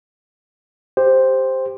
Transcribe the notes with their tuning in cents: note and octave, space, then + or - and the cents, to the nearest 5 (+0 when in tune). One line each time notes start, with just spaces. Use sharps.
G4 +15 C5 +0